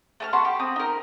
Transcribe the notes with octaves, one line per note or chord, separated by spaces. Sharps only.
A3 G#5 F6
B3 F#4 A5 C6
G4
C4 D#6
D#4 A#4